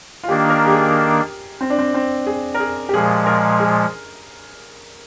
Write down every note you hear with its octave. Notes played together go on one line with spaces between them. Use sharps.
F4
D#3 A#3 D4 G4
A#4
G4
G#4
C4
D4
C4
C4
G#4
A#4
G#4
G4
A#2 F3 G#3 G#4
A#4
G#4